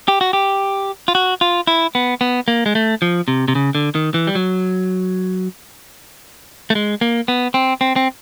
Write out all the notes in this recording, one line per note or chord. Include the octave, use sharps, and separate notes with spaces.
G4
F#4
G4
F4
F#4
F4
E4
B3
B3
A#3
G#3
A3
F3
C3
C3
C#3
D3
D#3
E3
G3
F#3
A3
G#3
A#3
B3
C4
C4
C4